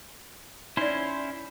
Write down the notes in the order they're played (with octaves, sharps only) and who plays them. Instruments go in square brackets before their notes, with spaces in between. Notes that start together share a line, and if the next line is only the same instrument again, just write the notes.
[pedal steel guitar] C#4 E4 C5 [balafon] D#4 D5